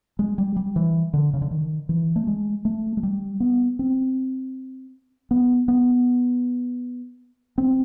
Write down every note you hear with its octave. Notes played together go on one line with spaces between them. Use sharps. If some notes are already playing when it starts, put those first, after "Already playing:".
G#3
G3
G3
E3
D3
C#3
D3
D#3
E3
A3
G#3
A3
G#3
G3
B3
C4
B3
B3
C4